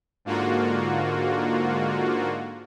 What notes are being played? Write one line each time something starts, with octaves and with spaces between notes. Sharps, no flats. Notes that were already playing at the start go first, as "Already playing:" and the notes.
G#2 D3 A#3 F4 F#4